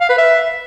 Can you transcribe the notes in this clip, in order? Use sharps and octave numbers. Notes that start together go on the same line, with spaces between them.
F5
B4
E5